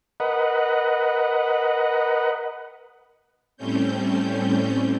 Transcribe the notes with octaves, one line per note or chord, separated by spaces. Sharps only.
A#4 B4 D#5 F#5
A2 G3 A3 C4 C#4 G6